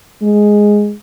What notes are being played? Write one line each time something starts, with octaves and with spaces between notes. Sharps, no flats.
G#3